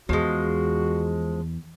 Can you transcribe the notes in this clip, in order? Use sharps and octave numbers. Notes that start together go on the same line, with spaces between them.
E2 F3 G#3 F#4